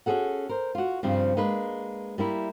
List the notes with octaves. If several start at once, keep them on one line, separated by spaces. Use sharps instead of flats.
C#4 F#4 G#4 A4 F#5
A#4 C5
F4 F#4
G2 C#3 F3 G3 C4
G#3 A#3 D4 B4
G3 A#3 E4